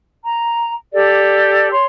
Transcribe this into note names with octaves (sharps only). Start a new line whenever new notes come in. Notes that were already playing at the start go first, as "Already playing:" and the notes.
A#5
G4 A4 D5
C#5 C6